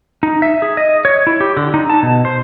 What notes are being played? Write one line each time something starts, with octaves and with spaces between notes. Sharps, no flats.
D#4
E5
G#4
D#5
C#5
E4
G4
D3
D#4
A5
B2
C5